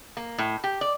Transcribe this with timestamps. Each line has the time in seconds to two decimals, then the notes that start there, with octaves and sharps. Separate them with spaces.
0.17 A#3
0.38 A2
0.64 G4
0.81 D5